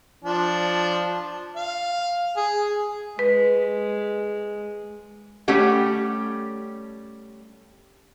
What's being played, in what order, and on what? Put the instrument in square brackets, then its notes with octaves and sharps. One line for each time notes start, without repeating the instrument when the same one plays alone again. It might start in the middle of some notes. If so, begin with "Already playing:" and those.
[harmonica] F3 D4
F5
G#4
[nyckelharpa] G#3 [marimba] B4
[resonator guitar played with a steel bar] G3 A3 C#4 G4 F#5